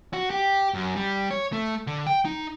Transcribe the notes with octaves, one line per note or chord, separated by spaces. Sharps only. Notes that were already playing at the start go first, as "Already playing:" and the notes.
F#4
G4
F#2
G3
C#5
A3
D3
G5
D#4